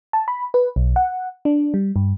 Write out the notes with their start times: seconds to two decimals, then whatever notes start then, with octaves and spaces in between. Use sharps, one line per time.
0.13 A5
0.28 B5
0.54 B4
0.76 B1
0.96 F#5
1.45 D4
1.74 G3
1.96 G2